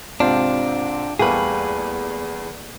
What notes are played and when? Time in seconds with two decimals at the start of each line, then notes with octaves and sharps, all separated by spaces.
0.20 G#2 C3 C4 D4 F4
1.19 E2 G3 A3 A#3 G#4 B4